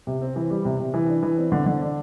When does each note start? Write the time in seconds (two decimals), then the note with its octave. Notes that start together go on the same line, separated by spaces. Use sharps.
0.07 C3
0.21 C4
0.36 E3
0.50 G3
0.65 C3
0.80 C3
0.94 E3
1.08 D4
1.23 E3
1.38 C4
1.52 D3
1.66 D3
1.82 D4